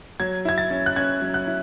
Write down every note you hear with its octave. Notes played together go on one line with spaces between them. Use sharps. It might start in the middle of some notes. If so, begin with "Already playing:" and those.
F#3 G#6
E4 G#6
A6
C#4
F#6
C#4 G#6
F#3
F#6
E4